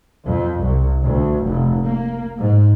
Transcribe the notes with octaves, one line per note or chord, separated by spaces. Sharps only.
F2
C2
D2
F1
A#3
G#2